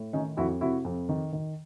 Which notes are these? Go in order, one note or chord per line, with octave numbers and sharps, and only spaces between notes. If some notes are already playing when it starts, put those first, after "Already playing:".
Already playing: A2
D#3 C#4 D#4
F2 E4 F#4
C3 E4 F#4
F2
D#3
D#3